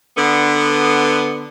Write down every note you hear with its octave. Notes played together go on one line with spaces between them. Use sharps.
D3 B3